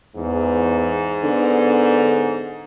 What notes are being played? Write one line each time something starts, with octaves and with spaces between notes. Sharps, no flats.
E2 G#2
D3 B3